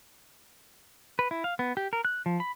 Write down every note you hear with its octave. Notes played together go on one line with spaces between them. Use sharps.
B4
E4
F5
B3
G4
A#4
F#6
F3
B5